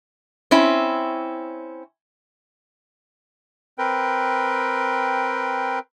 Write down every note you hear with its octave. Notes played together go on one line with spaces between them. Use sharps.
C4 C#4 E4
C4 A#4 B4 G5